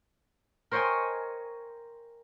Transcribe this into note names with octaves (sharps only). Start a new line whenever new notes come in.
A#4 C5 C#5 D#5 G5 G#5